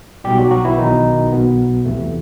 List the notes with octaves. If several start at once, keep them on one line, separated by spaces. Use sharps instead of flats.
B1 B2 G3 G4
F#3 F#4
F#3 F#4
E3 E4
B1 B2 D#3 D#4
B1 B2 B3
E2 C3 E3 A3